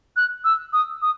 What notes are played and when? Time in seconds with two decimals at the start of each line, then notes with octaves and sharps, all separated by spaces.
0.16 F#6
0.44 E6
0.73 D#6
1.02 D#6